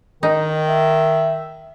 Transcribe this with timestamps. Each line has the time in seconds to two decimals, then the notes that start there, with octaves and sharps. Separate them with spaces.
0.23 D#3 D#4
0.69 E5